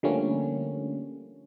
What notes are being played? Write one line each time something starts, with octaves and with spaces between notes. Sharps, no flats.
D3 F3 G3 A3 A#3 C#4